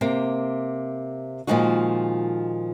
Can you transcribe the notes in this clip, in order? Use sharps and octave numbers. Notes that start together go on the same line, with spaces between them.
C3 A#3
A#2 D#3 F3 G#3 D#4 F#4